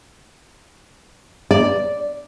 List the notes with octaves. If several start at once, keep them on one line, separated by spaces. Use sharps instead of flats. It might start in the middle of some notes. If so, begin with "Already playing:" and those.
D5